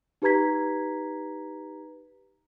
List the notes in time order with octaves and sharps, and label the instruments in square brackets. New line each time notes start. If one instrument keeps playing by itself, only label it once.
[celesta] D#4 G4 B4 A#5 G#6 B6